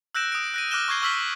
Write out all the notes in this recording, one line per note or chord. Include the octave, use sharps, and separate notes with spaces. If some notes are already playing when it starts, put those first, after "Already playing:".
E6 F#6 G6 A#6 D7 E7
D#6 D7
F#6 A#6 D#7
D6 F6 F#6 A#6 E7 G7
C#6 D6 G6 G#6 C7 G7
C#6 E6 F6 B6 F#7 G7